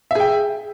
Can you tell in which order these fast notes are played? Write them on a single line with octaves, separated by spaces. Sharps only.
E5 G#4 G5